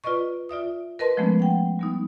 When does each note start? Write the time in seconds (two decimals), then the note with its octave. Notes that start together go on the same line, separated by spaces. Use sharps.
0.04 F4 B4 D5 D#5 C#6
0.49 F4 D5 E5 D#6
0.99 A#4 B4 D#5 A5 C6
1.17 F3 G#3 A3 B3 C#4
1.40 F#5 G5
1.79 G3 B3 D#4